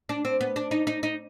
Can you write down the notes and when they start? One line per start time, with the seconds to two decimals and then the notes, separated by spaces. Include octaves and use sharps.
0.09 D4
0.25 C4
0.41 B3
0.56 D4
0.71 D#4
0.87 D#4
1.03 D#4